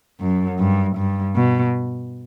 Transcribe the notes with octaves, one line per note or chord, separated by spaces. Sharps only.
F#2
G2
G2
B2